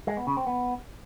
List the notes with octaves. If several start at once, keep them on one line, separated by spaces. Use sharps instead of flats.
G#3
B3
C#3
C4
B3